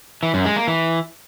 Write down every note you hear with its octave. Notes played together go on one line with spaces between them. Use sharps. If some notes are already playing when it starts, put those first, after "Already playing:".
E3
F#2
G#3
A#3
E3